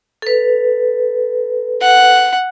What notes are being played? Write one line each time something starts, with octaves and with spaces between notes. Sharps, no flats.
A4 B4
F#5